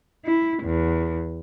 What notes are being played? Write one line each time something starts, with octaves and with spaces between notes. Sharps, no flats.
E4
E2